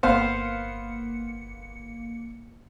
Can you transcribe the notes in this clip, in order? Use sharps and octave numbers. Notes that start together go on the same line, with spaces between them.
G1 A#3 B3 C5 F5 C#7